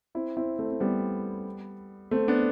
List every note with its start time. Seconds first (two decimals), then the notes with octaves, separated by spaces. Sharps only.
0.15 C4 E4
0.37 C4 E4
0.59 A3 C4
0.70 C4
0.80 G3 B3
2.11 A3 C4
2.28 B3 D4